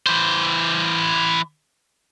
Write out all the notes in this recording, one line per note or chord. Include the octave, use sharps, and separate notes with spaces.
E3 C5